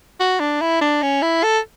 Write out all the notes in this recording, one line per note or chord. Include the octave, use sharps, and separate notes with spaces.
F#4
D4
E4
D4
C#4
E4
A4